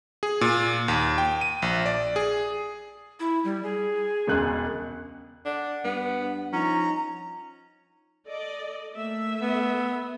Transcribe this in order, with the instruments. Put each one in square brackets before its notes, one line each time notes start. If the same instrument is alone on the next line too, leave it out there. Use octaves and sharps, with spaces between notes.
[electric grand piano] G#4
A#2
D#2
G5
D#7
A#1
D5
G#4
[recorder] E4
G3
G#4
[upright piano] E1 C#2 F#6
[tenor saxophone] D4 [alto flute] F#5
[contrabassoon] G2 [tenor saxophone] B3
[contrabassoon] F3 [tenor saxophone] C#4 [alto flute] D#4 [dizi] A#5
[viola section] A4 D5 D#5
A3 A#3 E5
[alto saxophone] B3